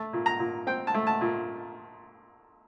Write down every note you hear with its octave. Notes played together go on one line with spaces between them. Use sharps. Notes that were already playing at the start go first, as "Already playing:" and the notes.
Already playing: A3 A5
A#2
A#5
A#2
C4 G5
A5
A3
A5
A#2